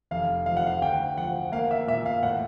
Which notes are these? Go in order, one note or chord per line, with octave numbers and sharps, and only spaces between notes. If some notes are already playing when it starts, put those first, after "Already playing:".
F1 F5
F3 F5
F#5
F5
D2 G5
F3 F#5
A#3 F5
E5
A#2 E5
F5
A2 F#5